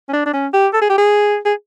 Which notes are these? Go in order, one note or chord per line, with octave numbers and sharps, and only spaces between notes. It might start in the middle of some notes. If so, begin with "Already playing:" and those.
C#4
D4
D4
C#4
G4
A4
G#4
G4
G#4
G#4